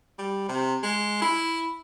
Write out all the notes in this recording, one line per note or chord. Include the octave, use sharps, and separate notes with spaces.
G3
C3
G#3
E4